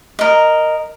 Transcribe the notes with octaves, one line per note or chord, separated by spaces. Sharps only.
A#4 D#5